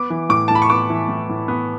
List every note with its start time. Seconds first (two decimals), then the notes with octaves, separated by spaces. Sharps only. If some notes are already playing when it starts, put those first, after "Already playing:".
Already playing: B3 D6
0.10 E3
0.29 A2 D6
0.48 A2 A5
0.55 B5
0.62 C#6
0.70 B3 D6
0.90 E3
1.09 A2
1.29 A2
1.48 B3